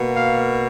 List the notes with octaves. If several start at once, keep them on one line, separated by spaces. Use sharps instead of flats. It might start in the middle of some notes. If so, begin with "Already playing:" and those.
Already playing: B2 A#3
F5